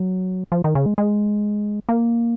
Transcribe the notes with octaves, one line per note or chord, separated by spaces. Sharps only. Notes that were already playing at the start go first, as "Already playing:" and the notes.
Already playing: F#3
F3
D#3
C#3
G#3
G#3
A#3